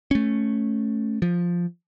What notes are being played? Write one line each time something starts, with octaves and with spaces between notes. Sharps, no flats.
A3 C#4
F3